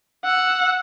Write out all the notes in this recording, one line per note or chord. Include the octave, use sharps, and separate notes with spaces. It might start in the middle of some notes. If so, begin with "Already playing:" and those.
F#5 E6